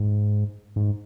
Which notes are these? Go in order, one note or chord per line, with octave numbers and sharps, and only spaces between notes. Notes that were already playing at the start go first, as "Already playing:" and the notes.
Already playing: G#2
G#2